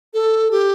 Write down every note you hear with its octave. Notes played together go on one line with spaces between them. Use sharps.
A4
G4